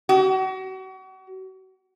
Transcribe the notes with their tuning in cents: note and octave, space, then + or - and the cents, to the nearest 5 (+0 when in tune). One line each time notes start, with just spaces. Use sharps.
F#4 +35